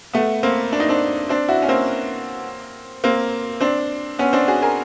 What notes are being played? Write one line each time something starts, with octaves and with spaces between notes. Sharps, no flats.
A3 B3
A#3 C4
D4
D#4
C4 D4
C4 D4
E4 F#4
C#4
A#3 C4
A#3 C4
C4 D4
B3 C#4
C4 D4
F#4 G#4
G#4 A#4